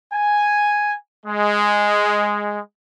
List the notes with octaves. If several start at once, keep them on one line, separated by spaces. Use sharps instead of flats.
G#5
G#3